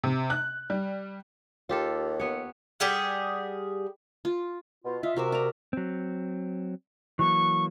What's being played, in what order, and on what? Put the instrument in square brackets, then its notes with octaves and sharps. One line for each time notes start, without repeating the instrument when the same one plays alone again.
[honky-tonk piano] C3
F#6
G3
[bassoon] D#2 [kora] F4 G4 A4
[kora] B3 C#5
[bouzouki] G3 G4 G#4 F#5
[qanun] F4
[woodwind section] B2 F4
[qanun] F4 [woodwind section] D#5 E5
[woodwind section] C3 [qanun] F#4 A#4 E5
[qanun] D5 A#5
[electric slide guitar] F#3 C4
[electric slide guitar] E3 F#3 A#3 [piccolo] C#6